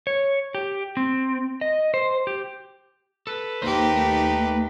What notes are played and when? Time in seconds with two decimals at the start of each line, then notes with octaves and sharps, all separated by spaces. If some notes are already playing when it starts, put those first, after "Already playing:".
0.07 C#5
0.55 G4
0.97 C4
1.61 D#5
1.94 C5
2.27 G4
3.27 A4 B4
3.62 D#2 A#3 D#4 G4 C5
3.96 A3